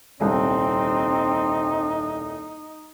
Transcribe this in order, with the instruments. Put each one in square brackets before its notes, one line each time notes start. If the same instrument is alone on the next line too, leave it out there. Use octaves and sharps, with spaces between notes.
[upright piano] D#1 C2 [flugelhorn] C4 [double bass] D#4